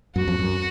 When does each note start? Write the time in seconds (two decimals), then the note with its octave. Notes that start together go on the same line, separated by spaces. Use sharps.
0.16 F#2 F#4
0.28 F2
0.39 F#2